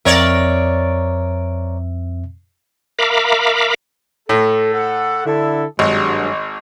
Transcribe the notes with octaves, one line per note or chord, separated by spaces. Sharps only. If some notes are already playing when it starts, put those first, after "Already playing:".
F2 C4 A#4 C#5 D5 E5
A#4 E5 F5 A#5 B5 D6
A2 A4
A4 F#5
D3 E4 A4
G#1 G2 F#3 G#3